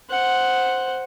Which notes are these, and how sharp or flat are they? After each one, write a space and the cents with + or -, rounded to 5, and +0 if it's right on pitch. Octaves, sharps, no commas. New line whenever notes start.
C5 +0 F#5 +0